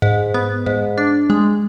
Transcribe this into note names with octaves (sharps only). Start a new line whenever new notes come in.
G#2
B3
G#2
D4
G#3